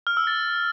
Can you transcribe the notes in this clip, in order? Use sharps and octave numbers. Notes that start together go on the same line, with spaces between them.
F6
E6
A6